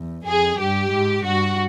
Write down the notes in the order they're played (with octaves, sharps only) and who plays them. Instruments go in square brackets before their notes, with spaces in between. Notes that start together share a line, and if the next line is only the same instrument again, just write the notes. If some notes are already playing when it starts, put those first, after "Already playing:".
Already playing: [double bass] E2
[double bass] F2 [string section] G#4
[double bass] G2 [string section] G4
[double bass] G#2
[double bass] G2 [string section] F#4